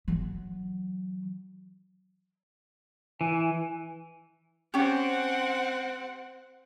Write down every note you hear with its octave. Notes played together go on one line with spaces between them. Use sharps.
E3 F#3
E3 G#5
C4 C#4 G4 F#5